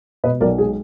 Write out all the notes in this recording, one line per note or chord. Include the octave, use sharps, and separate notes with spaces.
B2 B4 D#5
B1 A#4 D5
G#3 G#4